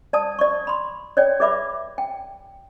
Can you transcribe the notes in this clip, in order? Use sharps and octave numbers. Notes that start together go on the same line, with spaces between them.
D5 A5 D#6
D5 C#6
B5 C6
C#5 D5 G5
G#4 B4 D5 E5 B5 D6
G5